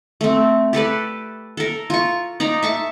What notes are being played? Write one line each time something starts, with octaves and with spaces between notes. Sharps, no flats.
A3 C4
G4 A4 B4 D5
A4 A#4
F4 C#6
D#4 D5 A#5
E5 A5 C#6